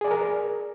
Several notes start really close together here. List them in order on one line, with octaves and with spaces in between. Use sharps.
G#4 D5 G#5 A#4